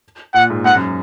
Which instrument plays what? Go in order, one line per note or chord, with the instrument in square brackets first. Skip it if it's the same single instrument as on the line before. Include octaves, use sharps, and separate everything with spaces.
[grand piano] A#2 [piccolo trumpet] F#5
[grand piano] G#2
[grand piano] G#2 [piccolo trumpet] F#5
[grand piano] F#2